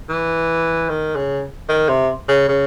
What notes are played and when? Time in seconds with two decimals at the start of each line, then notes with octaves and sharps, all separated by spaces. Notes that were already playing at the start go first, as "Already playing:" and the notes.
0.09 E3
0.89 D#3
1.16 C#3
1.69 D#3
1.89 C3
2.29 C#3
2.48 C#3